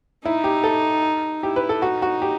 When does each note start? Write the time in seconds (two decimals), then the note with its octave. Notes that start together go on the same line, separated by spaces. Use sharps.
0.24 D#4 E4
0.44 G4
0.64 A4
1.42 E4 G4
1.56 B4
1.69 A4
1.82 D#4 F#4
2.02 F#4
2.22 G4